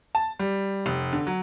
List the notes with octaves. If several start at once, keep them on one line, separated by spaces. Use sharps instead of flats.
A5
G3
F1
D3
F#3